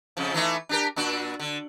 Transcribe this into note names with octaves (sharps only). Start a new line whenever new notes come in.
F2 C#3 F3
E3 A3 D#4
D4 G4 A#4
A#2 D4 F#4
D3